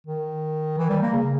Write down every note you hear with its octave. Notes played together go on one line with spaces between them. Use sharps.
D#3
E3
G3
A#3
C#3